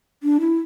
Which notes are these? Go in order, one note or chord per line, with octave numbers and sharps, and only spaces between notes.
D4
E4